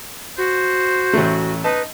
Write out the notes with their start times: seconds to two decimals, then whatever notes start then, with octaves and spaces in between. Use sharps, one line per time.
0.38 F#4 C5
1.13 A1 A3
1.64 D#4 B4 D#5 A5